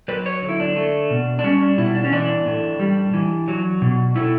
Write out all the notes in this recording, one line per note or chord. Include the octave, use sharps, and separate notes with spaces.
F#3 B4
C#5
D3
E4
D4
A3
B2
D4
G3 C#4
D4
B2 E4
D4
C#4
E3 D4
A2
G3
E3
F#3
B2
A3 E4